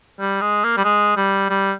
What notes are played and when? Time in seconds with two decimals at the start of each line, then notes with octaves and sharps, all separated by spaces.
0.20 G3
0.41 G#3
0.64 A#3
0.77 G3
0.84 G#3
1.17 G3
1.50 G3